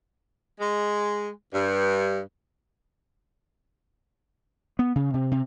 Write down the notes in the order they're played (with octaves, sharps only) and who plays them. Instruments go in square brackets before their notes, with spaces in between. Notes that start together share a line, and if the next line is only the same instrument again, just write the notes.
[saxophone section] G#3
G2
[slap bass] B3
C#3
C3
C3